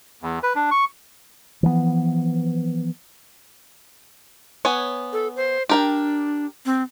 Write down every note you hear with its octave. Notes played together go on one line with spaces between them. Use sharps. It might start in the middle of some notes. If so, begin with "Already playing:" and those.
E2
B4
D4
C#6
E3 F3 A3 B3
B3 C#5 G#5
A4
C5
D4 G4 A#4 G5
C4